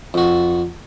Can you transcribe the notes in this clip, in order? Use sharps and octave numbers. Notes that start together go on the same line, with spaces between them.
F2 F#4